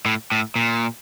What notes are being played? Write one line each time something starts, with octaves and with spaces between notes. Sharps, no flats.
A2
A2
A#2